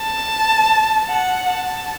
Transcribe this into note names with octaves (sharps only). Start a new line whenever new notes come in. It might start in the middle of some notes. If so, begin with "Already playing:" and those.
Already playing: A5
F#5
A5